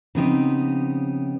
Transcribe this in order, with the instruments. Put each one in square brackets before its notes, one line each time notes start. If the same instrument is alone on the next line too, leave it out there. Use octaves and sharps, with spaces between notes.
[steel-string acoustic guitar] C#3 F3 B3 C4 D#4 G4